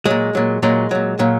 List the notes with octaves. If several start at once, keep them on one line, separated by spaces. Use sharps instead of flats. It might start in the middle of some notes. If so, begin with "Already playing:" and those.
A#2 F#3 G#3
A#2 F#3
A#2 F#3 G#3
A#2 F#3
A#2 F#3